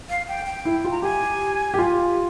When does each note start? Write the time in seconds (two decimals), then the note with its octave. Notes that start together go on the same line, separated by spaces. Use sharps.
0.09 F5
0.28 G5
0.46 G5
0.65 E4
0.85 F4
0.91 A#5
1.02 G4 G#5
1.74 G4
1.79 F4